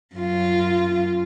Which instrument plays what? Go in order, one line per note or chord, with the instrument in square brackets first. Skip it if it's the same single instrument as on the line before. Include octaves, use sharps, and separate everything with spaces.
[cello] F#2 F4